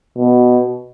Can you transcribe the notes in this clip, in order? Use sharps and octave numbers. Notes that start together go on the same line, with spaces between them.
B2